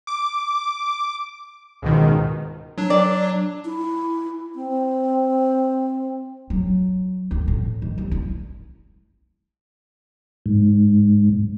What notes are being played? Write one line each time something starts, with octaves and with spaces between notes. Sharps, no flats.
D6
C#2 G#2 B2 D#3
F#3 D4
D5
E4
C4
F#3
D2
A2
D#3
C2
E4
G#2